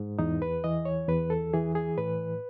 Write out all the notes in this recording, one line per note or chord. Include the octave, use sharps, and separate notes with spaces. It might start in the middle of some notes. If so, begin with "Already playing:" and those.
Already playing: G#2
E2 D#4
B4
E3 D#5
C#5
E2 B4
A4
E3 G#4
G#4
A2 B4